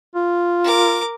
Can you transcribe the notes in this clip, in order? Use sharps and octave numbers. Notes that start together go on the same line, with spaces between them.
F4
A#4 D6